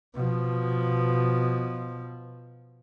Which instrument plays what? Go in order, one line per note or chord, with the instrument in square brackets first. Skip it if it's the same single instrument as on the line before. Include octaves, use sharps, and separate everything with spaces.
[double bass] B2 F3